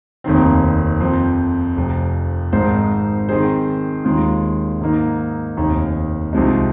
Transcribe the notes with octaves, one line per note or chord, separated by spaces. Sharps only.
F1 D#2 D#3 C4
F2 F3 C4
F1 F2 C3
G#1 G#2 G#3 D#4 C5
D#3 C4 G#4 C5
D#2 D#3 G#3 F4
G#2 D#3 A#3 D#4
F1 D#2 D#3
C2 C3 F3 G#3 D#4